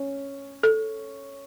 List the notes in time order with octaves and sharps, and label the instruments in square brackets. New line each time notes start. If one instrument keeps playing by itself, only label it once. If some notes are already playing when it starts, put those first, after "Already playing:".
Already playing: [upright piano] C#4
[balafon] A4